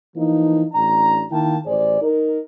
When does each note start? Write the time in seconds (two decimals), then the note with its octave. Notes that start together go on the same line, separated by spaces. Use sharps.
0.17 E3 F3 A#3 D#4
0.74 A1 D4 A#5
1.32 D#3 A#3 E4 G5 A5
1.66 A1 G#4 C5 D5
2.02 D#4 A#4